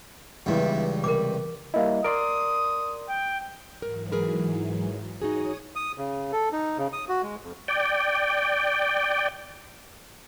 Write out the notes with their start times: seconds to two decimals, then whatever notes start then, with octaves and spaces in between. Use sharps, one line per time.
0.46 C#2 G2 D#3 E3 B3 D4 E4
1.04 C3 A#4 B4 D6
1.74 G3 A#3 E4 D#5 F5
2.04 A#4 D5 C6 D#6 D7
3.09 G5
3.82 G#2 E3 F#3 A#4
4.12 G#4 A#4 B4
5.22 D#4 F#4 G#4 C#5 D#6
5.76 D#6
5.98 C#3
6.32 A4
6.53 D#4
6.78 C#3
6.93 D#6
7.09 F#4
7.23 G#3
7.43 F2
7.68 D5 G5